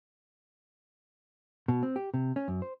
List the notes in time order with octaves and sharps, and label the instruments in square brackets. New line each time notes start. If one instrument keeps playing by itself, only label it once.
[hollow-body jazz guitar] B2
C4
G4
C3
C#4
F#2
C5